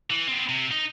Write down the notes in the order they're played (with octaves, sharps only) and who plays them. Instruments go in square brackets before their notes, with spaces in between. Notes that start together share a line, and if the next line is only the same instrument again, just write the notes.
[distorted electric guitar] E3
B3 C4
C3
D#4